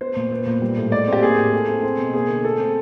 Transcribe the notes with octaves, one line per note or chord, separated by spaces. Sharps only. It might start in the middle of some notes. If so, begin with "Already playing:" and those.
B3 C5
A#2
B3
A#2
G3
A2
G#3 D5
C4 G4
A#3 G#4
A2
A3
C4
C4
B2
A#3 G#4
D3
A3 A4
C4